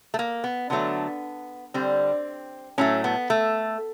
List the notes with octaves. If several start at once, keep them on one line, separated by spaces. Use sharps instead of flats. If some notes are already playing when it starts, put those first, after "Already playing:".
A3
A#3
B3
D3 F#3 A3 B3
D3 G3 C4
A2 F#3 A3 C#4
B3
A3